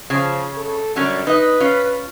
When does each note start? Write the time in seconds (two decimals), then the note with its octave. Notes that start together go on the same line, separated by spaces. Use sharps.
0.10 C#3 F3
0.57 A4
0.96 F#2 D3 G3 C#4
1.27 D#4 B4 D#5
1.60 C#4 F4